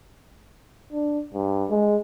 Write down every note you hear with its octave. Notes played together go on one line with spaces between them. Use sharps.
D4
G2
G#3